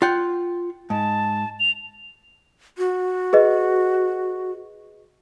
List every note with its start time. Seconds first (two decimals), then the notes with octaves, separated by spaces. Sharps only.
0.02 F4 F#5 G5
0.90 G#2 A5
1.60 F7
2.78 F#4
3.33 G#4 B4 D#5